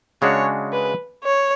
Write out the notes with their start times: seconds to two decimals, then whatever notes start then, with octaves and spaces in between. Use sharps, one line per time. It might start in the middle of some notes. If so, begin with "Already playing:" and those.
0.22 C#3 G#3 D4 F#4 C#5
0.73 B4
1.24 C#5